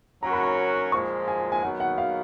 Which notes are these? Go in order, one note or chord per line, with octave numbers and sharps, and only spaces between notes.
F#3 C#4 F#4 A#4 A#5
B5
A#5
A#2 F3 G#3 C#6
G#5
G#5
D#3 F#3 B3 F#4 F#5
F#5
F5